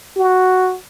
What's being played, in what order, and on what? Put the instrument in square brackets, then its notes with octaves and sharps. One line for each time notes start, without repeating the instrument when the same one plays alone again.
[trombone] F#4